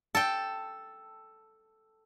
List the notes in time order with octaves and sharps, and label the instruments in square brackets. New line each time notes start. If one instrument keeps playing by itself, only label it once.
[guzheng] A4 G5